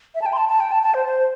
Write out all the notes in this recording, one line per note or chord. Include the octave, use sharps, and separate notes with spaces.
E5
A5
G5
C6
A5
A5
G5
A5
A5
C5
C5